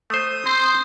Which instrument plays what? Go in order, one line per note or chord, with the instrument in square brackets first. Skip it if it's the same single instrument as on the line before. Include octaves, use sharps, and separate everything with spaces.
[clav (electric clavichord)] A3 C5 [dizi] D#6
[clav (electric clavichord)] C4 [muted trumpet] C5 [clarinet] C6